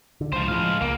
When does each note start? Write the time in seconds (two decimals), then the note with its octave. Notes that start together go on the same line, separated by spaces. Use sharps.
0.21 D3
0.32 C#2 F3 C5
0.48 A2 F3 G#3 F5
0.82 C#2 A#3